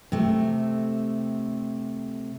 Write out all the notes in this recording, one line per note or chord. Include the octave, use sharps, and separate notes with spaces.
C3 A3